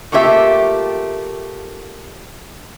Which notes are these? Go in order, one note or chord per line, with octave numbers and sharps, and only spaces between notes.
A3 A#3 F4 G4 C5 E5